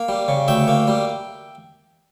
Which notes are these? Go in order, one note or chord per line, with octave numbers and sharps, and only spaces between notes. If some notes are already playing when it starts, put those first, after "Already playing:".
Already playing: A#3
G3
C#3
D2 E5 G5
A#3
G3